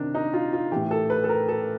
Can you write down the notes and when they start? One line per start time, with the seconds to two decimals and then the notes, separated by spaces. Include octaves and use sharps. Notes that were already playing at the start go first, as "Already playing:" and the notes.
Already playing: C3 D#3 D4
0.15 D#4
0.34 F4
0.53 F4
0.72 A2 E3 G4
0.91 A4
1.10 B4
1.24 A4
1.29 A#4
1.48 A4